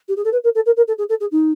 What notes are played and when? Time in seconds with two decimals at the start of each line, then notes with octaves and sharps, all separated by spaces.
0.08 G4
0.16 G#4
0.24 A4
0.32 B4
0.44 A#4
0.55 A4
0.66 A#4
0.76 A#4
0.87 A4
0.98 G#4
1.09 A4
1.20 G#4
1.31 D#4